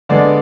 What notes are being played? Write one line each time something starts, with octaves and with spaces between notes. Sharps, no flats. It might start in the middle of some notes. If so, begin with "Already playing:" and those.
D3 G#3 B3 D5